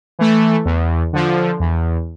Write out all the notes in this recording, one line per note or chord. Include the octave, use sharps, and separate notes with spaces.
E3 A3
E2
D3 F3
E2